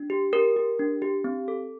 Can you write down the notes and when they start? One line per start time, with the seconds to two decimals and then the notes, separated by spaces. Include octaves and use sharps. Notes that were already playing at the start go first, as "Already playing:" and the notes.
Already playing: D4
0.10 G4
0.33 G4 A#4
0.56 G4
0.79 D4
1.02 G4
1.24 C4
1.48 A4